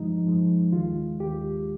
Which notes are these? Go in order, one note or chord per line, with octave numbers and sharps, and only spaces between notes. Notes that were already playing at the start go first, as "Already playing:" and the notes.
Already playing: G2 F3 G#3 D#4
G2 F3 G#3
D#2 D#3 G#3 F4
D#2 D#3 G#3 G4